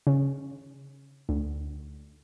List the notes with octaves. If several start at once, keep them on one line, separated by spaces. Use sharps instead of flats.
C#3
D2